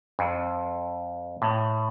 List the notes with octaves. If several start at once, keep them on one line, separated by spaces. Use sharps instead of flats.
F2
A2